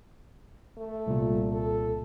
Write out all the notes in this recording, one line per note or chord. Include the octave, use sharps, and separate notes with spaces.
A3
C2 A#2
A4